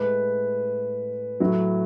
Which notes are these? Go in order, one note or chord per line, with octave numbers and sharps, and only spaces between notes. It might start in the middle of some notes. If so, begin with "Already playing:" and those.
Already playing: A2 G#3 B4
A2 F#3